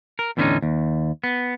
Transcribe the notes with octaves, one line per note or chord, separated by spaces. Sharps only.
A#4
E2 A2 D3 B3 C#4 D#4
D#2
B3